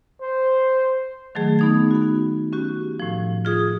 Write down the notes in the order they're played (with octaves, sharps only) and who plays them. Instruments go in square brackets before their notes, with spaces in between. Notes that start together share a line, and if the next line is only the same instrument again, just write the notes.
[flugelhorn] C5
[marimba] D#3 F#3 A3 G#4
B3 D#4 G#6
B3 F#4
C#4 F#4 G4
A2 F3
F4 G#4 D#6 G#6